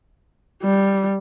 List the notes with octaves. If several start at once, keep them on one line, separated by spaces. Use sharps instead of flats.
G3